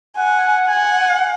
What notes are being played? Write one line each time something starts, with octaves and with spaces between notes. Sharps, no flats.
F#5 G#5
F#5 G#5